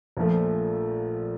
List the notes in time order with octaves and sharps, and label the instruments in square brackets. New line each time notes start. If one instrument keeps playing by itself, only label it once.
[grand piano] A#1 A#2 F3 A3